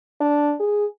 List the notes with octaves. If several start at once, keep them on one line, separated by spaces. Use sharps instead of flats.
D4
G#4